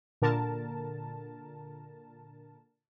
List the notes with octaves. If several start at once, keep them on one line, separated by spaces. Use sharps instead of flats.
A#2 D3 A#4 A5